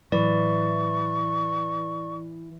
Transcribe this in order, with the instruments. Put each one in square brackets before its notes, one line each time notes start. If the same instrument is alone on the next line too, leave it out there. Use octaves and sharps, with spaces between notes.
[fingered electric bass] A2 F#3 [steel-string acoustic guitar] E3 [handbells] D5 [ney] C#6